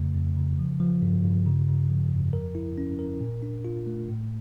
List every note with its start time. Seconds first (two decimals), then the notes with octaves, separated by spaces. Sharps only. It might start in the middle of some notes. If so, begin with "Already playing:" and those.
Already playing: F2 C#3 A3
0.15 F2
0.37 C#3
0.59 F3
0.80 F3
1.02 G2
1.24 G2
1.46 C#3
1.68 C#3
1.90 F3
2.11 F2
2.33 A#4
2.55 E4
2.78 C#4
2.99 A#4
3.20 A#2
3.42 D4
3.65 F4
3.87 A3
4.08 A2